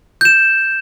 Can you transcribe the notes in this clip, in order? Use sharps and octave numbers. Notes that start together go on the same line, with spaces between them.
G6 E7